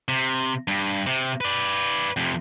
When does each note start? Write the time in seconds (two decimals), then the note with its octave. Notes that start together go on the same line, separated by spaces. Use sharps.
0.08 C3
0.68 G2
1.07 C3
1.41 B4 D5
2.17 F2 C3